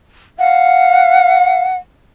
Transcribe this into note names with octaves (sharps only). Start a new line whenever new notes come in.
F5 F#5